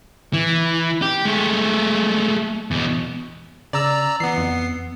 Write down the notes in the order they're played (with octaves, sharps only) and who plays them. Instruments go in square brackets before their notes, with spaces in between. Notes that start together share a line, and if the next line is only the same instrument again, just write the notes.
[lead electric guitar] E3
G4
G#3 A3
E2 B2
[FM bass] C#3 [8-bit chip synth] D5 A#5 E6
[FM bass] E3 [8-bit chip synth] B3 C7
[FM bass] F2